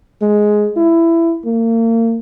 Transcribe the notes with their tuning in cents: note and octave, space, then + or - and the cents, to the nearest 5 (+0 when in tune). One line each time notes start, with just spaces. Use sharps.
G#3 +5
E4 +15
A#3 -35